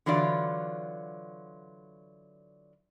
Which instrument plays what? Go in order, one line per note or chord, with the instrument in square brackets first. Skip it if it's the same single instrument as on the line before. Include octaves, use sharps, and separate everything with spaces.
[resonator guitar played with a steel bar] D3 E3 F#3 F4 D5